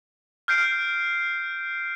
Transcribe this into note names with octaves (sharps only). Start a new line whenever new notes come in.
F6 G6 C7 D7